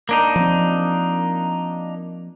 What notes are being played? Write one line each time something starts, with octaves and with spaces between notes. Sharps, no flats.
A#3 D4 D#4
F3 C4